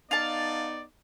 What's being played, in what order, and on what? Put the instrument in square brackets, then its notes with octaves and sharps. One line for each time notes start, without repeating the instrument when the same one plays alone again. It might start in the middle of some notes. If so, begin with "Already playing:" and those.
[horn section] B3 D#4 D5 [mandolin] F5 A5